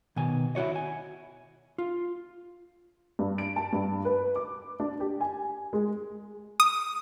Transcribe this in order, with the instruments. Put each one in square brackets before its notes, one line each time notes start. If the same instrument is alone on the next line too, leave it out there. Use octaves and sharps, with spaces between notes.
[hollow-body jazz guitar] B2 D#3 G#5
E4 F#4 C#5 D#5
G#5
F4
[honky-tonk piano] G2
D7
A5
G2
B4
D6
D4
G4
G#5
G#3
[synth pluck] D#6